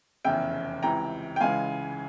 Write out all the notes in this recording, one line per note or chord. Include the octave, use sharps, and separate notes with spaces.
F1 E2 C#3 E5 G5
C#2 C3 E3 G5 A#5
G5
C#2 C#3 E3 G#3 F5 G#5